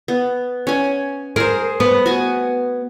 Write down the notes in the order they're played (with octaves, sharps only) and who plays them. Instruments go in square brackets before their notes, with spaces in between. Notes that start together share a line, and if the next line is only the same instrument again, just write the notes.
[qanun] B3
C#4 G#5
[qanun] G#4 C5 [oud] A#4
[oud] B3
[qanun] F#4 G#5